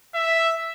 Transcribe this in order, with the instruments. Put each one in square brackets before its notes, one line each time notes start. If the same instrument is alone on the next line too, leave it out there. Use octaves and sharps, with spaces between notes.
[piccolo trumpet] E5